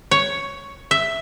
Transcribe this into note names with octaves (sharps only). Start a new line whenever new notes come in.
C#5
E5